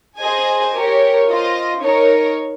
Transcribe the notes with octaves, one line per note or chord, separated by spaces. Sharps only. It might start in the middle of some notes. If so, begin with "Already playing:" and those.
G#4 C5 D#5 G#5
G4 A#4 C#5
F4 C5 D#5
D#4 A#4 C#5